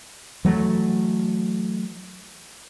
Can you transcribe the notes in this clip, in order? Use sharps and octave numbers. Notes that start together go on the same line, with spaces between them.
E3 F#3 A3